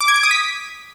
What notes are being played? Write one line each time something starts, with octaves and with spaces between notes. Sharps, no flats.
D6
G#6
D7
D#6
B6